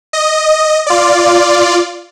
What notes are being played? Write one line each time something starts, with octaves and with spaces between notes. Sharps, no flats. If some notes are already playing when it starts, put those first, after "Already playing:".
D#5
F4 D5